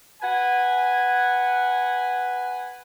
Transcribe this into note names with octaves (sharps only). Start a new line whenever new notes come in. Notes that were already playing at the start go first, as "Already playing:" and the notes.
B4 F#5 G#5